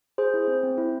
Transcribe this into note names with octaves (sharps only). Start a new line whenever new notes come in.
G#4 C5
E4
C4
C4
E4